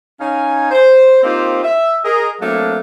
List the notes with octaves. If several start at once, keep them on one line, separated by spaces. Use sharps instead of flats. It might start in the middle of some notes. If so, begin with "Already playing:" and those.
C#4 D#4 F5 G#5
C5
A#3 C4 D#4 F4 G4 C5
E5
G#4 A#4 D#5
F#3 A3 A#3 C4 D4 F5